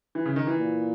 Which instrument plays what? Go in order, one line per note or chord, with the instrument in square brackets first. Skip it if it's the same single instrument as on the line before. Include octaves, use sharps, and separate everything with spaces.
[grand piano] E3
C#3
D#3
E3
[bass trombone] A#2